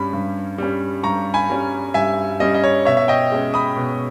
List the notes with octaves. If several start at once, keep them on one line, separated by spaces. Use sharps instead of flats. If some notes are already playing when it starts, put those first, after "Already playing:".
Already playing: G2 G3 C#4 B5
G2
G3 C#4
G2 A#5 C#6
G#5 B5
G3 C#4
G2 E5 G#5
G3 C#4 D#5
D#5
C#5
B2 C#5 E5
E5
D#5 G5
G#3 C#4
B5 D#6
B2